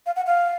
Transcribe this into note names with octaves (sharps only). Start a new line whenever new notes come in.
F5
F#5
F5